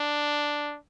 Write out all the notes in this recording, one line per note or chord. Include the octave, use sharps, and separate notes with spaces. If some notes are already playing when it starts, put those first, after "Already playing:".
Already playing: D4